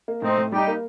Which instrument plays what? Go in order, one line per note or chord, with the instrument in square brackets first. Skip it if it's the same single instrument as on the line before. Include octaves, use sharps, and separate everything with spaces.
[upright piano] A#3
[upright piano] A2 [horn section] C4 D#4
[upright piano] A2
[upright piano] G3 [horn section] D#4 G4
[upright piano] A#3